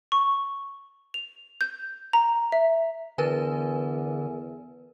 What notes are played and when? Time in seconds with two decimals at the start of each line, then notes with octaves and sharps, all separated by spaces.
0.12 C#6
1.14 F7
1.61 G6
2.13 A#5
2.52 E5
3.18 E2 D3 A#4 B4 G#5